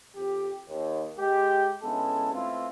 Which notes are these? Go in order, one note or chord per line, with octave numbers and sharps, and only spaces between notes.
F2 G4
D#2
G#3 G4
D3 G#3 B3 C#4 E4 A4
B2 A3 C4 E4 F4